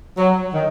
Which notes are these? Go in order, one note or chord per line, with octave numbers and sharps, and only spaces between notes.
F#3
D#3